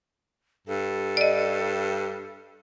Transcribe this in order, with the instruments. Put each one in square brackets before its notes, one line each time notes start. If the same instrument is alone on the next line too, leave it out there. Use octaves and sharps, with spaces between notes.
[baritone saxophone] G2 [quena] A4
[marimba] D5 D#5